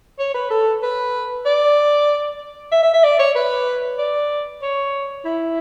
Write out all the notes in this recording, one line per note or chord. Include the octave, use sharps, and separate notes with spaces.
C#5
B4
A4
B4
D5
E5
E5
E5
D5
C#5
B4
D5
C#5
E4